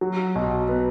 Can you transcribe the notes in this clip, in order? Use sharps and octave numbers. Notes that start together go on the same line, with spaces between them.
F#3
B1
B3